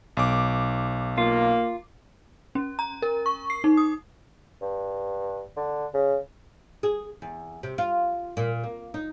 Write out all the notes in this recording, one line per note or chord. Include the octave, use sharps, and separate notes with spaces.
B1 D6
A#3 F4
C#4
A#5
A#4
C#6
C7
D#4
D#6
G2
D3
C#3
G#4
E2
C3
F4
A#2
A#3
D#4